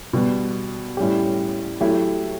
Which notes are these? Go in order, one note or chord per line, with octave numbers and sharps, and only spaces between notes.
B2 G3 B3
A2 G3 C#4 G4
F#3 A3 E4 G4